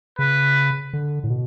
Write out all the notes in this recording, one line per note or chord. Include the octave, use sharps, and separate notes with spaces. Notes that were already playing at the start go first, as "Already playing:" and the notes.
C#3 B4
D3
A2
B2